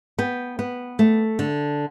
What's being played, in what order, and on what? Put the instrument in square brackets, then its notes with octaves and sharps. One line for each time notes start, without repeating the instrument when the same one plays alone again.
[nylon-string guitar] B3 G5
B3
A3
D3